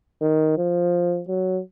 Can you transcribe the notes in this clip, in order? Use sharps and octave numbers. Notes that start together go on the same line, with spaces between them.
D#3
F3
F#3